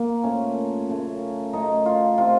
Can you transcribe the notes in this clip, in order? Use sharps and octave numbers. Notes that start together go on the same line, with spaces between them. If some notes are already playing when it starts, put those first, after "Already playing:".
Already playing: A#3
A#2 A3 C#4
F#2 C#3 A3
F#2 C#3 A3 D#4
F4
C3 D#3 A3 F4